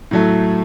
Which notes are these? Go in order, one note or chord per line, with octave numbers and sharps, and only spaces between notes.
A2 F#3 A3